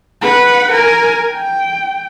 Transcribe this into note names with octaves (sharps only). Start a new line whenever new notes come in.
B4 F#5
A#4 G#5
G5